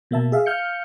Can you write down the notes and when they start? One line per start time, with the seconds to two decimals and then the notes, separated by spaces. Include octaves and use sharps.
0.11 B2 A#3 E5 A5
0.32 G#4 E5 F5
0.46 F5 F6 G6 C#7